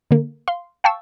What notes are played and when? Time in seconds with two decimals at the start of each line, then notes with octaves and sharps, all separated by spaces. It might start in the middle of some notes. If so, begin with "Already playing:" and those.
0.11 D3 A#3
0.48 F5 C6
0.84 F5 G5 A5 C#6 E6